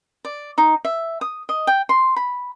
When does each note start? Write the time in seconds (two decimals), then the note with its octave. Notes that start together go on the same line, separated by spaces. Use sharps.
0.25 D5
0.58 D#4
0.85 E5
1.21 D#6
1.49 D#5
1.67 G5
1.89 C6
2.16 B5